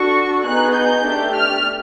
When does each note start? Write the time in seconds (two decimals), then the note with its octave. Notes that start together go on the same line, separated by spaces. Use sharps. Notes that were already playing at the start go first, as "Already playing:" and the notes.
Already playing: D4 F#4 A4 C#6
0.46 B3 D#4 G#4 F#6
0.76 G6
1.06 A3 D4 G4
1.35 F6